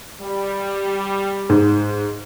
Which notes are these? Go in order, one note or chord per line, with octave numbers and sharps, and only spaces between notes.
G3
G#2